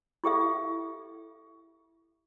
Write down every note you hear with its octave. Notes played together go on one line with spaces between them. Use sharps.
E4 G4 A4 E5